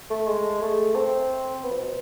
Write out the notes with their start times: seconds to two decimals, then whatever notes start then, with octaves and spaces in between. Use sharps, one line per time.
0.10 A3
0.28 G#3
0.62 A3
0.95 C4
1.63 B3
1.72 F3
1.80 B2